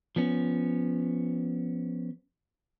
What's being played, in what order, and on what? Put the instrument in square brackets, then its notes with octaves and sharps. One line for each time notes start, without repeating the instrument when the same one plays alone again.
[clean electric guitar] F3 B3 C#4